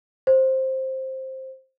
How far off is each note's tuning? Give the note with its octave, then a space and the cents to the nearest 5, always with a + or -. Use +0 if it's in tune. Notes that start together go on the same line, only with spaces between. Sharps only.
C5 +10